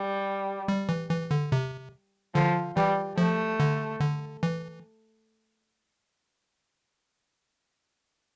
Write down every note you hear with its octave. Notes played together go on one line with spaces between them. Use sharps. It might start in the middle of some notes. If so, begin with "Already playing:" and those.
Already playing: G3
G3
E3
E3
D3
C3
D3 F3
E3 G3
F3 A3
D3
D3
E3